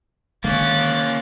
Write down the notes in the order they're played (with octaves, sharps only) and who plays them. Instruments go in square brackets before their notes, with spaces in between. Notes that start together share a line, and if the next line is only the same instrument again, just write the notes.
[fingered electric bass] D3 D#3 G#3 [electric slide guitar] A#3 C#4 [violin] F#6 A6